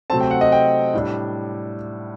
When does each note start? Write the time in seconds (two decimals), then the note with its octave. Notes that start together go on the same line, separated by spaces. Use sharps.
0.10 C3 F#3 A3 C4 A5
0.20 G5
0.31 F#5
0.41 D#5
0.52 G5
0.94 A2 G3 D4